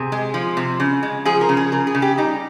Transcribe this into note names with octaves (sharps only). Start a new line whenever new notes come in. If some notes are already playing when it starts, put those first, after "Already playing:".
Already playing: C3 G#4
G#3
F3
C3
C#3
G#3
F3 G#4
A#4
C#3
G#4
C#3 A#4
G#4
C#3
G4
G3 D#4